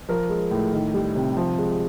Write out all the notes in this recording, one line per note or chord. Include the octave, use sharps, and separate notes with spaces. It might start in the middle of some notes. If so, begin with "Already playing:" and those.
F3 A#4
G#3
A2
D#3
G3
C3
F3
G#3